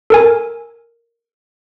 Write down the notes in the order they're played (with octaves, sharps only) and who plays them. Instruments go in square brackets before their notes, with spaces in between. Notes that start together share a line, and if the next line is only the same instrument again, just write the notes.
[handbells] A4 A#4 G#5